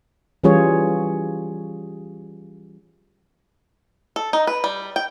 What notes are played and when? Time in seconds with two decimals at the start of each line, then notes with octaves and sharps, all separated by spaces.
0.44 E3 G3 C#4 F4 G#4 C#5
4.16 A4
4.33 D#4
4.47 B4
4.64 G3
4.96 G5